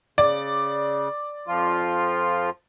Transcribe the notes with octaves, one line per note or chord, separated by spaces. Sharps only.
C#3 D5
F2 F3 F4